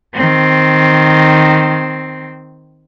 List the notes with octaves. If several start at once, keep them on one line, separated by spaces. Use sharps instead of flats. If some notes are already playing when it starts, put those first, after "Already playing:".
D#3 C4